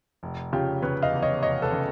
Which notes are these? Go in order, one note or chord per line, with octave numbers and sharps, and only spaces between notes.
F1
C#3 F4 G4
C#3 B4 C#5
D#5 F5
E2
C#5 D#5
F1 C#5 D#5
A4 B4
C#3